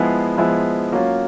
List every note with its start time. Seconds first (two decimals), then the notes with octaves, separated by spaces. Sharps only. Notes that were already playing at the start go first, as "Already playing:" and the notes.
Already playing: F3 G#3 B3 E4 G#4
0.37 F3 G#3 B3 E4 G#4
0.92 F#3 A#3 C#4 F4